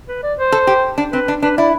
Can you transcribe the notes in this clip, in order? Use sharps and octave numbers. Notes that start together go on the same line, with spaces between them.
B4
D5
C5
A4
G4
D4
C4 B4
D4
D4 B4
E4 D5